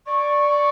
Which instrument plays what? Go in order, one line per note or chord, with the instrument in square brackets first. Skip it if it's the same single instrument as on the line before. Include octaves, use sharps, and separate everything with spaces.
[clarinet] D5 [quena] C#6